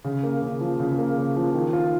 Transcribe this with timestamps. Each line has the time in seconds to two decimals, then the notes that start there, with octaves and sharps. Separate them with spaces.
0.04 C#3
0.23 A#3
0.42 C#3
0.61 F3
0.80 C#3
0.98 A#3
1.16 C#3
1.36 F3
1.54 D#3
1.73 F4